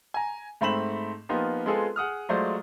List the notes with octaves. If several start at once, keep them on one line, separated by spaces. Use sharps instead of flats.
G#5 A#5
G#2 A3 C4 B5 E7 F#7
F3 A#3 B3 D#4 F4 G4
G#3 B3 C4 F4 G#4 A4
G#4 F#5 D#6 F6
F#3 G#3 A3 F4 C5 D5